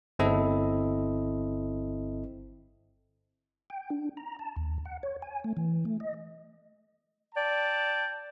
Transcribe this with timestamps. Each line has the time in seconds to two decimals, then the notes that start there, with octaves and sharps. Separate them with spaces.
0.19 G1 C4 E4 A4 D#5
3.70 G5
3.90 D4
4.17 A#5
4.39 A5
4.56 D#2
4.85 F#5
5.03 C#5
5.22 G#5
5.44 A3
5.57 E3
5.85 A3
6.00 D#5
7.35 D5 G5 A5